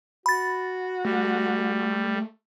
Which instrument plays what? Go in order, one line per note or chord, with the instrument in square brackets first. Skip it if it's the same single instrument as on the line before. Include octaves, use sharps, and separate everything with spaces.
[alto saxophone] F#4 [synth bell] B5 A6
[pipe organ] G3 [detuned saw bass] A3